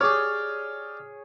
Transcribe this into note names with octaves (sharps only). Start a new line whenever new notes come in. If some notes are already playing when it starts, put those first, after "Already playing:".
G4 G#4 C#5 D5 F6